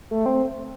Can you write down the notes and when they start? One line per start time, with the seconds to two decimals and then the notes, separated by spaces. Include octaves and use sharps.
0.11 A3
0.26 C4